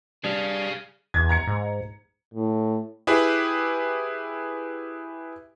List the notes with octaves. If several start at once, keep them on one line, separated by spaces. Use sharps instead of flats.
G3 D4 G#4 F5
E2 G#6
A#5 G#6 C#7
G#2
A2
E4 G4 G#4 B4